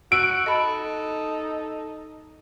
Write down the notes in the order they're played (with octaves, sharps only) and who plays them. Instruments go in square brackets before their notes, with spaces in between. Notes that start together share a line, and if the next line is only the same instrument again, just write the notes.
[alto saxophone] F#4 [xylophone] E6 [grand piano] D7
[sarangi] D#4 [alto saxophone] A4 [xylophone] D#5 B5